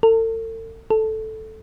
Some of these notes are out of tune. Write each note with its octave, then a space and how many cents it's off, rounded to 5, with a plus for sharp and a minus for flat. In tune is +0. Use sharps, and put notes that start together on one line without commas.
A4 +40
A4 -5